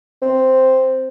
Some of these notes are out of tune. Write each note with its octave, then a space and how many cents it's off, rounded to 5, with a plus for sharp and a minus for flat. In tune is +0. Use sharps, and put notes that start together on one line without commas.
C4 +0